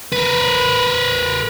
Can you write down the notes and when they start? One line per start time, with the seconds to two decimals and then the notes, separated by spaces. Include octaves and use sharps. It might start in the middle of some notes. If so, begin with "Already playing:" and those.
0.12 A#4 B4